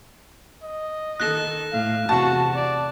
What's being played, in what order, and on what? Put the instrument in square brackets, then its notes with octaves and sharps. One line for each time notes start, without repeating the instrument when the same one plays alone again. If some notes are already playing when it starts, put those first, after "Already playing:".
[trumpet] D#5
[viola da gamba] D#3 A4 [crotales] F#6 A#6 E7
[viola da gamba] A2 [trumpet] F5
[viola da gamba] E2 C3 [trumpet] F#4 [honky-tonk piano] A5
[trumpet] D5